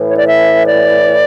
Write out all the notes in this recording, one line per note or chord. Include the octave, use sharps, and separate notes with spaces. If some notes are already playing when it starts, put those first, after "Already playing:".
Already playing: A2 E3
C#5
D5
E5
D5